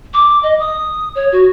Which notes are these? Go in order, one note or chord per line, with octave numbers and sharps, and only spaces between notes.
D6
D#5
D#6
C#5
F#4